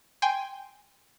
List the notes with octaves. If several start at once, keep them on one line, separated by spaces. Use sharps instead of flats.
G5 G#5 C6